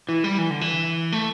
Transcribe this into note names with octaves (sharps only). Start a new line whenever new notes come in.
E3
G3
E3
D3
E3
A3